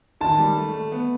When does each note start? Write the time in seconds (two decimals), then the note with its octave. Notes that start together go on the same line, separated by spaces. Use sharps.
0.21 D#3 A5
0.39 G3
0.56 A3
0.74 A3
0.92 B3